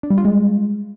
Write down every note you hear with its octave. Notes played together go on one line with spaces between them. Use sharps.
D4
G3
F4
G#3